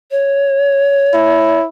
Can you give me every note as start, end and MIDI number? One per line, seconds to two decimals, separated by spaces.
0.11 1.60 73
1.13 1.66 64